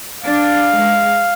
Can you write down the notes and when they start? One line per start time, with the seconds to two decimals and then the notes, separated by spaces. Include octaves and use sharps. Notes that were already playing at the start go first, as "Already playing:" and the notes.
0.23 D4 F5
0.71 G#3